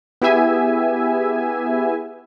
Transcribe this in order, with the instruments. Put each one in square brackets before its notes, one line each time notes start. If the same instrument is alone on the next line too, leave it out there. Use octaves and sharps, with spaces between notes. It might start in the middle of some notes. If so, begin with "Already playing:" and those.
[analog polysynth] B3 E4 G4 G#4 E5 G#5